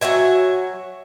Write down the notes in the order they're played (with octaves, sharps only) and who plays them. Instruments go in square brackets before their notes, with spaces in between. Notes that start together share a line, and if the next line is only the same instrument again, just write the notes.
[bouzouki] F#3 C#5 E5 G#5